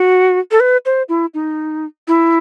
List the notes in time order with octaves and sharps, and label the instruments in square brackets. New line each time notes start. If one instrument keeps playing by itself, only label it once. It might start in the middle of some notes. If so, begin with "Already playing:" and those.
Already playing: [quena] F#4
A4
B4
C5
E4
D#4
E4